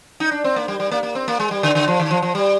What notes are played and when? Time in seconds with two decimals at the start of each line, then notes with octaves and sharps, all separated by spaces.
0.20 D#4
0.31 D4
0.44 C4
0.56 A#3
0.68 G3
0.80 G3
0.91 A#3
1.03 A#3
1.15 C4
1.28 A#3
1.40 G#3
1.51 G3
1.63 D3
1.75 D3
1.88 F3
2.00 D#3
2.11 F3
2.22 F3
2.35 G3